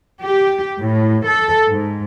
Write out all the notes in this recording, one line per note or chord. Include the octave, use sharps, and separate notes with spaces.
G4
A2
A4
G#2